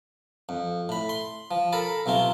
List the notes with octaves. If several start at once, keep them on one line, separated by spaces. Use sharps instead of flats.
F2
A2 B5
C6
F3
A4 A#4 A5 B5
B1 C3 C4 F4